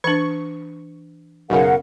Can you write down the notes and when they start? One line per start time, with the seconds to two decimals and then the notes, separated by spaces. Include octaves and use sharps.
0.04 E3 D4 C#6
1.50 B1 F#2 C#3 A#4 F5 F#5